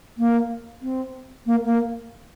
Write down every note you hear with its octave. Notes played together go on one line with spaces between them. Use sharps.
A#3
C4
A#3
A#3